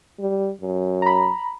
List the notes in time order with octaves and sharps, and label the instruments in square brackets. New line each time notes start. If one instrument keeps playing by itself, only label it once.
[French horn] G3
F#2
[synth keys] A#5 B5